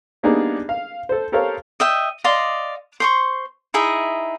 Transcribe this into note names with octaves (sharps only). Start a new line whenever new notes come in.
G3 A#3 B3 D4 D#4 G#4
F5
A4 C5
G4 A4 A#4 C5 C#5 F5
D#5 E5 G5
D5 D#5 F5 C6
C5 C6 C#6
D#4 E4 G#4 E5